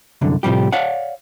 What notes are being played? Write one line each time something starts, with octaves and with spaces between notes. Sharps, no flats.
C2 F#2 D3
A2 C3 F3 G3 G4
C#5 D5 F5 F#5